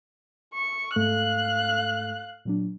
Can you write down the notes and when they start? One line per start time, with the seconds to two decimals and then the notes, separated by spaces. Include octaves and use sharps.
0.55 C#6
0.96 G#2 A3 A4 F5 F#6
2.45 A#2 F#3 D4